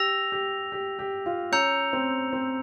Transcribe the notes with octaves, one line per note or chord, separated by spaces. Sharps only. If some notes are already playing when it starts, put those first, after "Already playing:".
Already playing: G4 E6 A#6 F7
G4
G4
G4
F4
C#4 A#5 E6 G6 C#7 F7
C4
C4